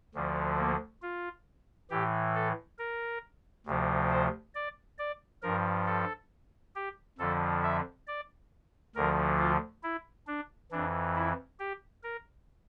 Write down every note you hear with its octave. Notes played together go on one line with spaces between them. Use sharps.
D2 D3 F3
A#3
F4
A2 E3 G4
A4
A#4
D2 C3 F3
C5
D5
D5
G2 F3 A#4
A4
G4
F2 D3 F3 A4
E5
D5
D2 D3 F3 A#4
F4
E4
D4
F2 E3 D4
E4
G4
A#4